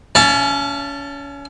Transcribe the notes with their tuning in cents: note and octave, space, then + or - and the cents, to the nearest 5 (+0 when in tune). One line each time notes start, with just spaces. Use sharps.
C#4 +30 F5 -40 A5 +0